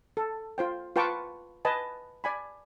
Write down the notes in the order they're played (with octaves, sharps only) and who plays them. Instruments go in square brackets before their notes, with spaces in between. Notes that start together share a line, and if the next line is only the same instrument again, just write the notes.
[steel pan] A4
F4 C5 G5
F4 B4 G5 A5 C#6 D6
B4 D#5 G#5 A5
D5 G#5 B5